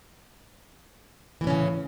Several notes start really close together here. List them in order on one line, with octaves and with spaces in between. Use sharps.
E3 A2 C#4 C#3